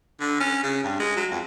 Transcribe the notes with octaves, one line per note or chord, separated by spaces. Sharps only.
D3
C#4
C#3
G2
G#3
F#3
F2